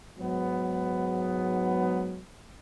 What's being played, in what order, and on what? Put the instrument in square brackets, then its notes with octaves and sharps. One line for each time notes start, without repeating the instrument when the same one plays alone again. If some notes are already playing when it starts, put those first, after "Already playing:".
[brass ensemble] G#2 F#3 B3